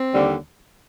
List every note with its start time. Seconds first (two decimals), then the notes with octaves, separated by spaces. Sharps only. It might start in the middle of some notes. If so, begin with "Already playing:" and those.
Already playing: C4
0.12 D#2 D3 G3